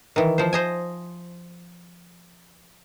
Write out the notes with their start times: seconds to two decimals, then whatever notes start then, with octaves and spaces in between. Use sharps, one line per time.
0.16 D#3 E3
0.38 F3 C5
0.53 C5 D#5 G#5